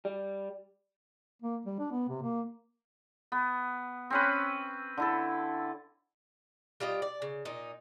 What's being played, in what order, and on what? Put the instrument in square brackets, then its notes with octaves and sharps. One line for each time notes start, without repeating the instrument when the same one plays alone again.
[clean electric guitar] G3
[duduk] A#3
G3
D4
B3
C3
A#3
[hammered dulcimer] B3
C4 C#4 B4
D3 E4 A4
[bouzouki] G3 F4 G4 D#5
D5
C#3
A#2 D#4